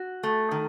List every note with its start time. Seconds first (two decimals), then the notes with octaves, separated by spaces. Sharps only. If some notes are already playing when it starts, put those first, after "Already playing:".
Already playing: F#4
0.23 A3
0.51 D#3